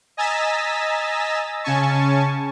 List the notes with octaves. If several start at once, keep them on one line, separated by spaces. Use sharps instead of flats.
D#5 G#5 A#5 E6 A6 B6
C#3 C#4 G#5 A5 C#6